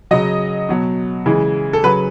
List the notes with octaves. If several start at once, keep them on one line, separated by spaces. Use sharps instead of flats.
C#3 F#3 D#5
B2 F#3
C#3 E3 G#3
A4
C#3 F#3 B4